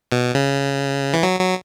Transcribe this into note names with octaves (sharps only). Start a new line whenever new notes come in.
B2
C#3
E3
F#3
F#3